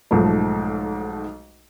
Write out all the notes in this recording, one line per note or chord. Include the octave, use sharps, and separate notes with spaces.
B1 G#2 F3 A3